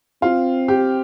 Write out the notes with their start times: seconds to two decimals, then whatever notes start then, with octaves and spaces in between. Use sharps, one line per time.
0.22 C4 F4
0.68 G4